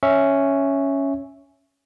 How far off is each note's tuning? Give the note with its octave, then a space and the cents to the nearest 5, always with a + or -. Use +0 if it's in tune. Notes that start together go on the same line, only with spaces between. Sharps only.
C#4 +0 E5 +0 C#6 +0